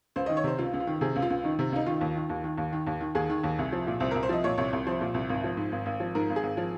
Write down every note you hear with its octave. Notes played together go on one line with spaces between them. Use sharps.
C#2 C5
D#3 D#5
C#5
C3 C5
C#2 F4
C#2
F4
D#3
C3 G#4
C#2
F4
C#2
D#3 D#4
C3
C#2 D#4
D#3 F4
D#2
D#3
D#2
D#3
D#2
D#3
D#2
D#3
D#2 G#4
D#3
D#2
C2
F3
A#2
C2 C5
C2 A#4
C5
F3 D#5
A#2 C#5
C2 C#5
C2
F3 C5
A#2
C2
G#1
F3
G#2
G#1
G#1
F3
G#2 A#4
G#1
G#4
G#1
F3